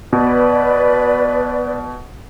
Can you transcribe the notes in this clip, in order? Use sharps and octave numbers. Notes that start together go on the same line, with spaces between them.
B2 B4 D5